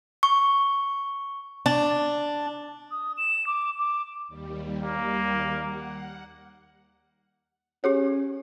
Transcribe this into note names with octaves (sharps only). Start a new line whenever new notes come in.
C#6
D4
D#6
E7
D6
D6
D#2 G3
A#3
F#5
C#4 G4 G#4 C#5